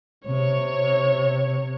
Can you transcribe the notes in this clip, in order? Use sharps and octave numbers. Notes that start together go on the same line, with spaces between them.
C3 C#5